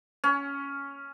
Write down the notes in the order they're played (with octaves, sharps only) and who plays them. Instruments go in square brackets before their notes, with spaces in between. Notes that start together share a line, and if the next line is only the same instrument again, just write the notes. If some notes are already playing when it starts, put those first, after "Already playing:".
[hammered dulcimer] C#4